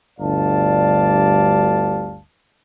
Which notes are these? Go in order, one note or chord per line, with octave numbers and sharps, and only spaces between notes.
G1 D2 G3 D5 F5 A5